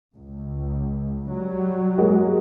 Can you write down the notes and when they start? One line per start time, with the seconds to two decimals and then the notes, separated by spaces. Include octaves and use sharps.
0.16 C#2
1.31 F#3 G3
1.98 G#3 A#3 F#4